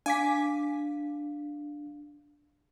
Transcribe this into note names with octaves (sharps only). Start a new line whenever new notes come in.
D4 F5 G#5 D6 B6